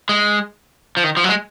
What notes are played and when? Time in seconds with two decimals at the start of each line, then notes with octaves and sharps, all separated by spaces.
0.09 G#3
0.97 F3
1.04 D#3
1.17 F3
1.24 F#3
1.29 G#3